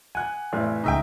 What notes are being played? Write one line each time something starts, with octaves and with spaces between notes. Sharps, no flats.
F#5 G#5 F#6
F1 A2 E3
C#2 C#3 D#4 D#5 E5 G5